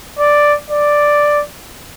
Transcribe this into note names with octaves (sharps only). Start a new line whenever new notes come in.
D5
D5